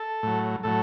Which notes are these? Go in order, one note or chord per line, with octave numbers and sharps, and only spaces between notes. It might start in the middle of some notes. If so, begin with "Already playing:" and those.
Already playing: A4
A2 F#3
A2 F#3 A4